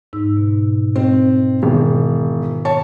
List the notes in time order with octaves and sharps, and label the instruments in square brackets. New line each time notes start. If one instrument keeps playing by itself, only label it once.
[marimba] G#2 D#4 E6
B2
[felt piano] C4 [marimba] D#5
[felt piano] E1 [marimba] D#3
[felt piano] C#5 A5